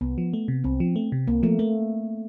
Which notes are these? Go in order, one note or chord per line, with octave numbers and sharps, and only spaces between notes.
C2 B3
F3
A3
C3
C2 C4
F3
A3
C3
C2 A#3
F3 A3
A3 A#3